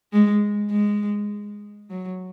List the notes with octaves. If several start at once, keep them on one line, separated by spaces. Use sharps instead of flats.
G#3
G#3
F#3